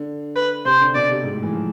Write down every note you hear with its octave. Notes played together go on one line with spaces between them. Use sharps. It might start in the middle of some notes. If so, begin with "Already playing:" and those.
Already playing: D3
B4
C3 C5
D3
B2 D5
C3
G#2
A2
E3
F3